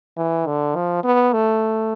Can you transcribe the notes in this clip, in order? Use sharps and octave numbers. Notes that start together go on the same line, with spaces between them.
E3
D3
F3
B3
A3